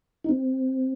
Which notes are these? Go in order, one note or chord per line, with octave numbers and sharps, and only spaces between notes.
D#4
C4